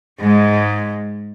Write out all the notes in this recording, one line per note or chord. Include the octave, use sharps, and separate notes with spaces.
G#2 G#3